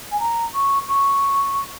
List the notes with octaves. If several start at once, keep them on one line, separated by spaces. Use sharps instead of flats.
G#5
A#5
C#6
C#6